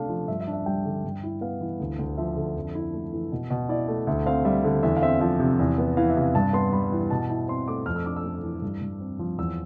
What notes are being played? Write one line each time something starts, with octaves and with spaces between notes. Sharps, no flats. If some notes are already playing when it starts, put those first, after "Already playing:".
Already playing: C3 A3 D4 F5
F3
G2 E5
E5
D4
E5
G3 G5
D3
G2
E4
B3 F5
E3
D2
D2
F3 E5
D3
F2
E4
A3
E3
B2
B2
E4 D5
A3
D2 E5
C4 F5
G3 E5
D3
E2 E5
F5
C4 E5
F3 E5
C3
E2
B3
E3 F5
E5
C3
F5
G2 A5
B3 C6
G3 B5
E3
B2 A5
E4
C4 C6
A3 D6
F2 F6
E6
D4 D6
E6
A3
E3
G2
G2
C4
F3
E2 E6